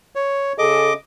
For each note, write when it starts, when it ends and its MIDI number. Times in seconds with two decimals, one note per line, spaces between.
0.15 0.53 73
0.58 0.91 49
0.58 0.91 68
0.58 0.91 69
0.58 0.94 75
0.58 0.94 86